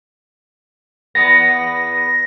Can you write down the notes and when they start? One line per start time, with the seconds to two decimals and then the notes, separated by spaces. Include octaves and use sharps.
1.15 E2 B3 A#6